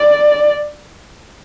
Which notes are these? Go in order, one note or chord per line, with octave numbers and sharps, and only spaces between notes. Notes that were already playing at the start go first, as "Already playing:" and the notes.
Already playing: D5